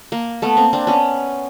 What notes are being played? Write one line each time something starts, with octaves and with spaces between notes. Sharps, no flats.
A#3
A3 B3
A#3 C4
C4 D4
B3 C#4